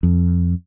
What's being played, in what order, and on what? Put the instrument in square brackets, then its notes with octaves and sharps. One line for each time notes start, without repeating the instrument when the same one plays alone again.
[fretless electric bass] F2